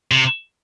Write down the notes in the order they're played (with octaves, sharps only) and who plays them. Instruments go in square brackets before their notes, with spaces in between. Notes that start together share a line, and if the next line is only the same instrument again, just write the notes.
[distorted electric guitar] C3